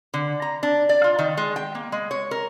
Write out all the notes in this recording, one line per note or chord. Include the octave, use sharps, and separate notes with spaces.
D3
A#5
D4
D5
F4
D#3
G#3
G5
A#3
G#3
C#5
A#4